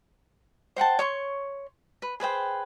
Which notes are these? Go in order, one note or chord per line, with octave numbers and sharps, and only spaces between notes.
C5 F#5 G5 A5
C#5 C6 C#6
B4
G#4 B4 C5 G5